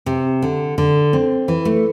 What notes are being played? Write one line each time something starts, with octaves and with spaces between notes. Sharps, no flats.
C3
D3
D3
C4
E3
A3